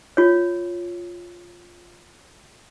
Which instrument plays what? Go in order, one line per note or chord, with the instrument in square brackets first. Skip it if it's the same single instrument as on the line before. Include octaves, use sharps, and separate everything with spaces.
[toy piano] F4 C#5